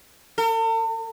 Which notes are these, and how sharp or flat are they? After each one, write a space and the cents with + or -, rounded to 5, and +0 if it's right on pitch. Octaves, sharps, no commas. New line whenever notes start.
A4 +45